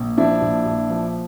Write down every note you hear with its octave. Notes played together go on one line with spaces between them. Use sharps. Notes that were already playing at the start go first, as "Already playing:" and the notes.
Already playing: A#1
F3 D4 E4
A#1
A#1
F3